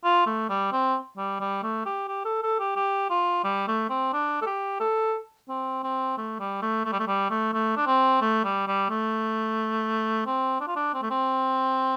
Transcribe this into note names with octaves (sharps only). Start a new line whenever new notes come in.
F4
A3
G3
C4
G3
G3
A3
G4
G4
A4
A4
G4
G4
F4
G3
A3
C4
D4
A4
G4
A4
C4
C4
A3
G3
A3
A3
G3
A3
G3
A3
A3
D4
C4
A3
G3
G3
A3
C4
D4
F4
D4
C4
A3
C4